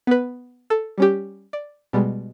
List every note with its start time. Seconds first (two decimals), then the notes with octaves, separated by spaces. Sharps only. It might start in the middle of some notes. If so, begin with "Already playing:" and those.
0.07 B3 B4
0.70 A4
0.98 G3 C#4 G4
1.53 D5
1.93 B2 G3 G#3